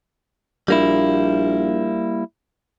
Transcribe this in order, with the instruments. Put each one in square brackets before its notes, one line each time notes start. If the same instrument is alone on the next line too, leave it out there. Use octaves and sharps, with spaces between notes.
[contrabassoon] A#1 [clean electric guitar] G3 A#3 E4